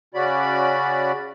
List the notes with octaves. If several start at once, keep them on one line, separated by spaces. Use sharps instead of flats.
C#3 C#4 F#4 D5 B5